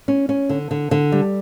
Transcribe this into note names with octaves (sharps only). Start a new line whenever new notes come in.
C#4
C#4
D3
D3
D3
G3